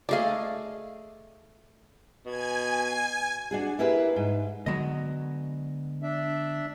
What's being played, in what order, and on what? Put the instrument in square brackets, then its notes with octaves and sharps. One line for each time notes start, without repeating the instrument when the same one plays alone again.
[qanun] A3 G#4 D#5 [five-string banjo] D5 F5
[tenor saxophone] B2 [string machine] G#5 G#6
[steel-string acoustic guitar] D4 F#4 G#4
E4 G4 G#4 A#4 B4 E5
G#2
[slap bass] D3 G#3 B3 [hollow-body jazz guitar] F#3 D#5
[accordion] D4 E5